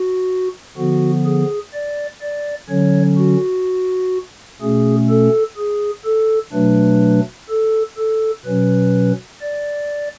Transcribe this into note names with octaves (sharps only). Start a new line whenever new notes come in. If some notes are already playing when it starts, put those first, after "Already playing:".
Already playing: F#4
D3 F3 B3 F#4
G#4
D5
D5
D3 F#3 C#4 C#5
F#4
B2 A3 C#4 G#4
A4
G#4
A4
B2 F#3 A3 D4 B4
A4
A4
B2 F#3 C#4 B4
D5